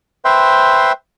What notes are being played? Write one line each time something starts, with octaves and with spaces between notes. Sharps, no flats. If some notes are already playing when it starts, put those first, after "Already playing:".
B4 C5 E5 G5 C6